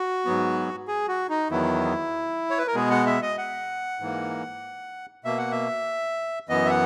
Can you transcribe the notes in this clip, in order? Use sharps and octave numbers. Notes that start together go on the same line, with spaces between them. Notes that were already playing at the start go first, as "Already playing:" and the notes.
Already playing: F#4
G#2 F#3 B3
G#4
F#4
D#4
E2 D#3 F#3 B3 E4
C#5
B4
A#4
B2 G#3 B3 G#4
F#5
E5
D#5
F#5
G#2 E3 A#3
B2 A#3 E5
F#5
E5
F#2 E3 B3 D#5
E5
F#5